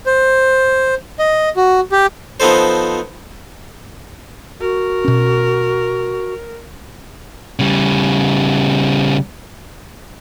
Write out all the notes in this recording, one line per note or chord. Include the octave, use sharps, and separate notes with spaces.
C5
D#5
F#4
G4
F3 B3 D#4 A4 C5
F#4 A#4
B2 C#4
C#3 G3